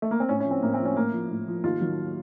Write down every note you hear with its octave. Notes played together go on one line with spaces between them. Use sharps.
A3
A#3
C4
A2 C#4
C#4
F3
C4
A2 A#3
C4
F3
C#4
A2 A#3
F3
A2
F3
D#2 F4
D#3 F#3